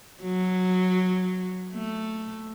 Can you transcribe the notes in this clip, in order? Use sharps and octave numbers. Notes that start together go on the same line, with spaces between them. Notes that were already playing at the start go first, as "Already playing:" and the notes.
F#3
A3